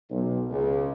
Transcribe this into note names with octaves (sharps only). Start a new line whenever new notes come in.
B1
C#2